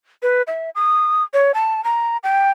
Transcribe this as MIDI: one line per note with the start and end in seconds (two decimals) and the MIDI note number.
0.23 0.42 71
0.47 0.70 76
0.75 1.23 87
1.34 1.52 73
1.54 1.83 81
1.84 2.17 82
2.23 2.51 79